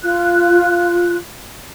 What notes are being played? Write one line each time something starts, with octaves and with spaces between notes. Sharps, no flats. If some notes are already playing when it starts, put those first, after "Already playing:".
F4 F#6